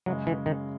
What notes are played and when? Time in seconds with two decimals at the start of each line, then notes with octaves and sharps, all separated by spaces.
0.06 F#2 C#3 F#3 G#3
0.27 E3
0.46 D#3